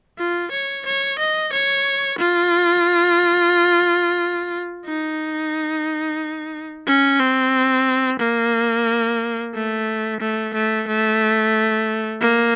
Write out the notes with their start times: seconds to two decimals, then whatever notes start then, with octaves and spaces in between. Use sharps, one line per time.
0.18 F4
0.52 C#5
0.86 C#5
1.19 D#5
1.53 C#5
2.18 F4
4.85 D#4
6.86 C#4
7.20 C4
8.20 A#3
9.54 A3
10.20 A3
10.54 A3
10.88 A3
12.21 A#3